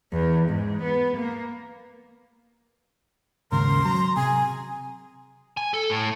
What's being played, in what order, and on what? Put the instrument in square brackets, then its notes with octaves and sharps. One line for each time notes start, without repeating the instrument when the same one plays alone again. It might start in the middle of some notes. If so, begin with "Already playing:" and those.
[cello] E2
G#2
B3
A#3
[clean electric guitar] D#2 G#2 C#3 [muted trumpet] A#4 [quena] C6
[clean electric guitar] F#3 [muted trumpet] A#5
[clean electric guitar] C3 [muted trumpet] G#4 [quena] G#5
[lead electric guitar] G#5
A4
A2